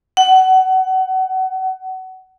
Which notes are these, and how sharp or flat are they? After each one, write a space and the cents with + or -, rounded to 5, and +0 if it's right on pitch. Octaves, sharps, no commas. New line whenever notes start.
F#5 +25